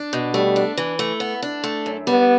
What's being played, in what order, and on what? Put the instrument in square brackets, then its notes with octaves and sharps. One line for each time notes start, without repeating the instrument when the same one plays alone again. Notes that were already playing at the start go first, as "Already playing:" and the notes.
Already playing: [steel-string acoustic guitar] D4
B2
[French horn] G3 [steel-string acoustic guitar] A3
[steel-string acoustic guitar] D4
E3
A3
B3
D4
A3
F#2
[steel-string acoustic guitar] G3 [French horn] B3